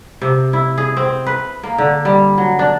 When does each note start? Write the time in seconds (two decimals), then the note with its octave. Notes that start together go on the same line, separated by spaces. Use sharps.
0.22 C3
0.53 E4
0.78 G#4
0.97 C4
1.26 B4
1.63 A#3
1.78 D3
2.05 G3
2.38 F#3
2.59 D4